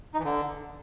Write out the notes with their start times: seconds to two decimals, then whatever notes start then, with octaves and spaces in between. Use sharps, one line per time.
0.14 D#4
0.19 E3
0.24 D3